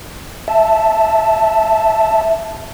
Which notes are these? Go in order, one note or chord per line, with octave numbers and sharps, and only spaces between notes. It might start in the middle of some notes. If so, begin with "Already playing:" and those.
E5 A5